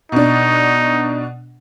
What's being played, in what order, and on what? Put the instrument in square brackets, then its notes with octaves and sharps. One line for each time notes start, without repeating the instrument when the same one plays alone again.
[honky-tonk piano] B2 D4 [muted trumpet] D#4